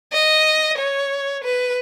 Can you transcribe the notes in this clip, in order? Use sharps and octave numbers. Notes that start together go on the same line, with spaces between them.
D#5
C#5
B4